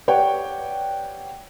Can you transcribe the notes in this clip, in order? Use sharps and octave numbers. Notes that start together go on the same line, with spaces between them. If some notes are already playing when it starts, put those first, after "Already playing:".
G4 B4 C#5 D5 F#5 G5